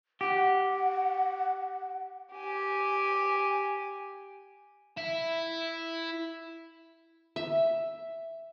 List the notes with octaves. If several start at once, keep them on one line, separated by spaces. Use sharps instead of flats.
G4 F#5
G4 G#5
E4 E5
E5